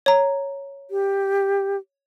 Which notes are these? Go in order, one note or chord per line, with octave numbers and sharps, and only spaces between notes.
C#5 A#5
G4